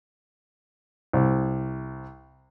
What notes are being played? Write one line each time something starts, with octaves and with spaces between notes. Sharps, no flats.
C2